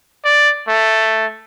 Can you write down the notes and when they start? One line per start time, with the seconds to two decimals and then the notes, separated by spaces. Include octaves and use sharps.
0.25 D5
0.68 A3